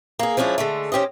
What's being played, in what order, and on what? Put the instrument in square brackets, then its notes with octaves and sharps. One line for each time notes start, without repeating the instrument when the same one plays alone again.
[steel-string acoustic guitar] A#3 G#4
F3 G#3 C#4 D4 E4
D3 G#3 A3
C#4 G4 C5 D#5